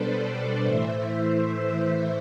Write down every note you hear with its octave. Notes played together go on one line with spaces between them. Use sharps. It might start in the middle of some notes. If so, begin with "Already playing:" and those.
Already playing: B2 G3 D4 A4 B4 C5 D5
A2 E3 A3 C5 E5